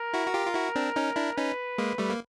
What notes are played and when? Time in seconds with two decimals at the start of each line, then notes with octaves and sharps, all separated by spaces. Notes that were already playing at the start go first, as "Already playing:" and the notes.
Already playing: A#4
0.14 E4 F#4
0.27 F#4
0.34 F4 G4
0.47 F4
0.54 E4 F#4
0.75 C4 D4
0.96 C#4 D#4
1.16 D4 E4
1.37 C#4 D#4 B4
1.78 G#3 A#3
1.98 G3 A3
2.10 A#3